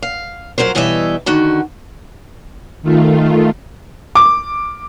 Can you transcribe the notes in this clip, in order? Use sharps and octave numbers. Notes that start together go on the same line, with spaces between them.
F5
F2 G#2 F#3 A#4 C5
B2 E3 G3 C#5 D#5 E5
D3 D#3 F#4
D#3 A3 F4
D6